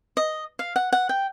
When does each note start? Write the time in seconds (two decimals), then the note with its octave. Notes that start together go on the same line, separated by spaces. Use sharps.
0.17 D#5
0.59 F5
0.76 F#5
0.93 F#5
1.09 G5